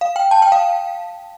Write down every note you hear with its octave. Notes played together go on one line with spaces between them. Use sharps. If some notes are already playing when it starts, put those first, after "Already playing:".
F5
G5
A5
G5
F5